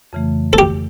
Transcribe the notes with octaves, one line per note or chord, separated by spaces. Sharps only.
F2 C#3 E3 A3
A4
G4